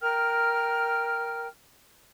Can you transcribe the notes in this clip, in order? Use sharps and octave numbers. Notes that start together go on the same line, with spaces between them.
A#4 G5 F6